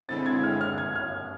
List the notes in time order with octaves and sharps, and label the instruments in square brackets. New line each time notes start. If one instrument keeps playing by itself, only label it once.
[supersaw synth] D3 G#3 C4 E4 [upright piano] A6
[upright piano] G#6
F6
F6
G#6
F6